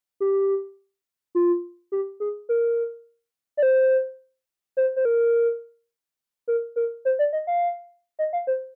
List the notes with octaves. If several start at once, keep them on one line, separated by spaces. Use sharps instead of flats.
G4
F4
G4
G#4
A#4
D5
C5
C5
C5
A#4
A#4
A#4
C5
D5
D#5
F5
D#5
F5
C5